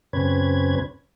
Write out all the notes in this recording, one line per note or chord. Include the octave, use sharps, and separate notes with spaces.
F#2 C#3 C4 C#4 B4 G#6